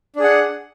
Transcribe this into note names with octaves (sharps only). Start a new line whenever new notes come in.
D4 G#4 F#5